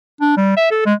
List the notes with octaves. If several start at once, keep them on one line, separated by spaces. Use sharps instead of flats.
D4
G3
E5
A4
G#3